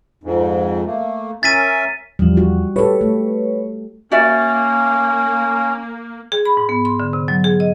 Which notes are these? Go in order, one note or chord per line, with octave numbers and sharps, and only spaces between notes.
F2 G#2
A3 A#3
C#4 A#4 E5 A6 B6 D#7
E2 F3 G3
F#4
G4 A4 B4 C#5
A3
A#3 C#4 F#4 D5 E5
G#4
B5
G#2
B3
C6
D3
C3
F#3
G#4
D#5